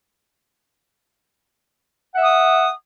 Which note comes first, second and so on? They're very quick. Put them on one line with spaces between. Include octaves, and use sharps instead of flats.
F#5 E5 D#6